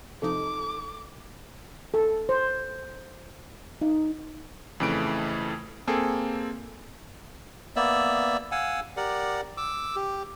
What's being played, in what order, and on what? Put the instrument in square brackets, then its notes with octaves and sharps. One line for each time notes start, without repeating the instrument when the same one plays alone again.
[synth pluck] C3 F3 D#4 [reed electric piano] A4 [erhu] D6
[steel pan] A4
C5
D#4
[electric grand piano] F2 C#3 E3 A3 D7
A#3 C4 G#4 A4
[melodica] A#3 B3 D5 E5
F5 F#5 G#5 E6
G4 A#4 D5 F#5
D6 E6
G4